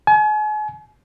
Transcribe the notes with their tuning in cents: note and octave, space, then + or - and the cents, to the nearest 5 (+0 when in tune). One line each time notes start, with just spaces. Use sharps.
G#5 +40